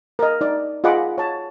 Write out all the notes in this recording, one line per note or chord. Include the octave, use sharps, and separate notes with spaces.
A#4 D#5
D#4 D5
F4 G#4 D#5 F#5 B5 D6
C#5 A5